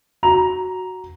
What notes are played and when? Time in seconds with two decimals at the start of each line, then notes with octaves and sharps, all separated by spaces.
0.23 F#4 A#5 F7